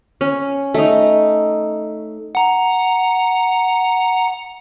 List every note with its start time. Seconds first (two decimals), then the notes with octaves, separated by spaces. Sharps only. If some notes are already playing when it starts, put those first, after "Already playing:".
0.21 C#4
0.74 A3 D#4
2.35 F#5 A#5